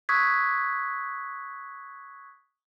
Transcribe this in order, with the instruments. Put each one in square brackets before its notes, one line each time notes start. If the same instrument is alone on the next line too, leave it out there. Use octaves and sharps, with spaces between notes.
[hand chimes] C#6 D#6 E6 F#6 G#6 B6